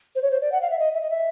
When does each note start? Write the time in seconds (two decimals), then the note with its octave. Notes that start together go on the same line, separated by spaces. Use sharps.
0.15 C5
0.22 C#5
0.31 C5
0.41 D5
0.52 F#5
0.61 F5
0.70 E5
0.79 D#5
0.94 E5
1.01 D#5
1.10 E5